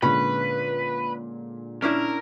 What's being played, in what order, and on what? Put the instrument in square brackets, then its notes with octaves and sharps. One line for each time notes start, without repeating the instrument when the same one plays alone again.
[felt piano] A#2 D3 G#3 [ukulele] C#4 B5 [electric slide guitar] B4
[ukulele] C#4 D4 E4 [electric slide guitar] A#4